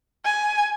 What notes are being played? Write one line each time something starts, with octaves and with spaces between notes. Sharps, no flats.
G#5